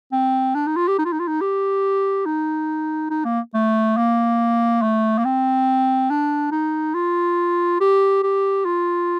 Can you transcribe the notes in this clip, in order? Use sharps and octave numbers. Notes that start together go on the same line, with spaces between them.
C4
D4
D#4
F4
G4
D#4
F4
D#4
F4
D#4
G4
D#4
D#4
A#3
A3
A#3
A3
A#3
C4
D4
D#4
F4
G4
G4
F4